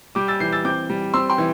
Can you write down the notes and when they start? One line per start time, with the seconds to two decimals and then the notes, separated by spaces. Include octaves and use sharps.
0.15 G3 D6 G6
0.28 E6 A6
0.40 E3 G6 C7
0.52 E6 A6
0.64 C4 D6 G6
0.90 G3
1.14 C4 C6 E6
1.30 G5 C6
1.38 E3